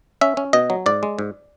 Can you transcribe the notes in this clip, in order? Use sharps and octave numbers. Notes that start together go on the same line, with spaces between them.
C#4 E5
C#4
B2 D#5
F#3
G#2 D5
G#3
G#2